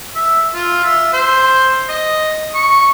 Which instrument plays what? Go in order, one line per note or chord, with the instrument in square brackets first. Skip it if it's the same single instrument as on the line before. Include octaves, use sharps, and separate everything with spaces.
[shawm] E5
F4
E5
C5
D#5
C#6